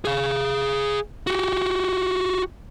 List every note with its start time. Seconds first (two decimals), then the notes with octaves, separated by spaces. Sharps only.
0.05 G#4 F5
1.27 F#4 G4